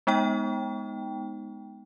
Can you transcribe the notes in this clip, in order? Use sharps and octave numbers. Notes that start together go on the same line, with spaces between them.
G#3 B3 D#4 G5